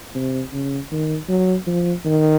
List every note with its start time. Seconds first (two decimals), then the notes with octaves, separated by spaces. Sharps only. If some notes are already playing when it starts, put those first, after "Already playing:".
0.15 C3
0.53 C#3
0.91 D#3
1.28 F#3
1.67 F3
2.05 D#3